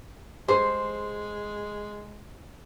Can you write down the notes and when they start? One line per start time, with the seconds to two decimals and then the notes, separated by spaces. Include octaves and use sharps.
0.48 G#3 G#4 C5